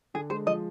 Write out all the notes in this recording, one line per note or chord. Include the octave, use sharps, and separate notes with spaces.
D3 G#4
G#3 C5
F3 D#5